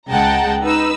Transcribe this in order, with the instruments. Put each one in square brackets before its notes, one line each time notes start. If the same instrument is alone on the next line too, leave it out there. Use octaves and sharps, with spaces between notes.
[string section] C#2 G#3 F#5 G5 A5 A#5
D#4 B4 E6